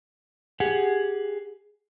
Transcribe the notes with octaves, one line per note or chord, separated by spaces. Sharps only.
G4 G#4 F#5